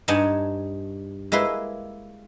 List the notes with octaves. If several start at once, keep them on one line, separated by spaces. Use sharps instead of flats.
G2 D#4 F#5 G#5 A5
G#3 A#3 E4 B4 C6